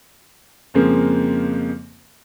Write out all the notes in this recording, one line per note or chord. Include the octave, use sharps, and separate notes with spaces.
F2 C#3 F3 G#3 A#3 C4